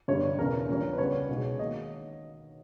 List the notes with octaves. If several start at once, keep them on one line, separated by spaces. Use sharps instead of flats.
G1 G2 G3 C#5
E1 E2 C#3 A#4
A#1 A#2 G3 C#4
B4
C#2 C#3 G3 B3 C#5
B1 B2 G#3
D#3 A#3 D#5